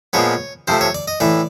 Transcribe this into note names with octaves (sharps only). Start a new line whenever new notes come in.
A#2 F3 G#3 B3 C#5
C3 F3 A3 C5
C#5
D5
D#5
A2 E3 A3 D5